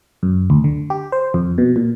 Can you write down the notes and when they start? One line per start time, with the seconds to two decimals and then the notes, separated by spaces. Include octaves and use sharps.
0.23 F#2
0.50 D2
0.64 D3
0.90 G4
1.12 C5
1.34 F2
1.58 B2
1.76 A#2